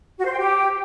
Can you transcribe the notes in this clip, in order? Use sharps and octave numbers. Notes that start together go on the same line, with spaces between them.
F#4
C5
G5
G4